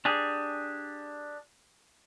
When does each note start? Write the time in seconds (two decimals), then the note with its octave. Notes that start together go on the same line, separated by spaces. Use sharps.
0.05 D4 G4 G#4